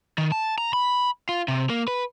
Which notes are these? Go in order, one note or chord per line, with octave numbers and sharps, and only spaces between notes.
D#3
A5
A#5
B5
F4
C3
A#3
B4